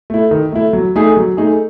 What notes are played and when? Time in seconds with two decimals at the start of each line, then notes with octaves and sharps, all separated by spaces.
0.10 A3 E4
0.31 D#3
0.52 A3 E4
0.73 F#3
0.96 A3 D#4 G#4
1.17 F#3
1.37 A3 D#4 G#4